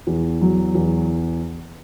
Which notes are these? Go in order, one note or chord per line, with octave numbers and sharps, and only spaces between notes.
E2
F#3
E2